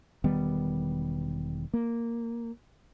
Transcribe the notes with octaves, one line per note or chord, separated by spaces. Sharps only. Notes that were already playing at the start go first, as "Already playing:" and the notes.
E1 D#3 G3 B3
A#3